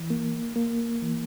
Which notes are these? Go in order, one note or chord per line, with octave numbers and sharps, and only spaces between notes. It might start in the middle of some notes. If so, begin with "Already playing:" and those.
Already playing: E3
A#3
A#3
E3